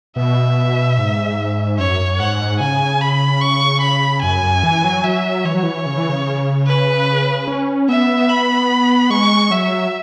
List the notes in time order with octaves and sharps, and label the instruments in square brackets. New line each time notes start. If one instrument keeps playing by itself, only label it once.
[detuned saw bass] B2 [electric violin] E5
[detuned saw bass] G#2
[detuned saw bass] F#2 [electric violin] C#5
[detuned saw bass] G#2 [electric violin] F#5
[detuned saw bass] C#3 [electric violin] G#5
[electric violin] B5
C#6
B5
[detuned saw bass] F#2 [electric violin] G#5
[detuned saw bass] F#2
E3
F#3
[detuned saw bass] F#3 [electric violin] E5
[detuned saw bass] E3 [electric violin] C#5
[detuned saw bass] F#3
E3
C#3
E3
C#3
[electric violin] B4
[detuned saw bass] C#4
[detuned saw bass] B3 [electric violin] E5
[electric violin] B5
[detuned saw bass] G#3 [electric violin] C#6
[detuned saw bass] F#3 [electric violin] E5